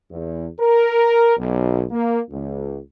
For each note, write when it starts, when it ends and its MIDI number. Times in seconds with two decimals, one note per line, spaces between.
0.11 0.46 40
0.59 1.34 70
1.37 1.84 35
1.91 2.19 58
2.31 2.78 37